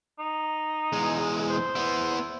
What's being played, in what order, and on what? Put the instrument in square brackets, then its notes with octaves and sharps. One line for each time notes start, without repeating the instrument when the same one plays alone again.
[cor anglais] D#4
[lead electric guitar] E2 G#3
[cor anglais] C5
[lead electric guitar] B3 E4